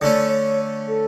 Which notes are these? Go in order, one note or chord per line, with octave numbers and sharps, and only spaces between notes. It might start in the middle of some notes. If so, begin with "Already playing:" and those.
D3 A3 C#4 D5
C#5
A4